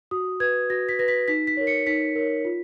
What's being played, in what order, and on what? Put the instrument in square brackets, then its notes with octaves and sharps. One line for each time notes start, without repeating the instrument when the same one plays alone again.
[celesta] F#4 D#6
B4 G#6
F#4 A#6
B6
B4 A#6
B6
D#4 B6
B6
A#4 C#5
C#7
D#4 B6
A#4 C#5
F4